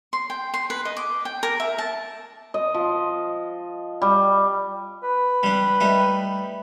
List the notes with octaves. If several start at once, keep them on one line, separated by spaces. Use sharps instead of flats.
C6
G5
C6
B4
D#5
D6
G5
A#4
E5
A5
D#5
F3
G3
B4
G3 D4
G3 A3 D#4